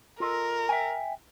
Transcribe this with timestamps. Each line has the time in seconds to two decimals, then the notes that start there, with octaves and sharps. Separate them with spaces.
0.20 F4 A4 A#4 D#5
0.69 E5 G5 G#5